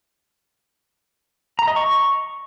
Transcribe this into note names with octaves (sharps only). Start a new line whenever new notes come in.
A#5
D#5
C#6